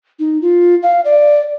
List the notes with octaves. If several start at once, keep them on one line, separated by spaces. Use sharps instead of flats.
D#4
F4
F5
D5